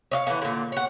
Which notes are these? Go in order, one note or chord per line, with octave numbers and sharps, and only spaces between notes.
C#5 D#5 F5
D3 E3
A#2 D3
C#5 F#5